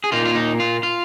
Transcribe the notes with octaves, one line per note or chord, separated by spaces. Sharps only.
G#4
A#2 A#3 D#4 F4
F4
D#4
F4
F4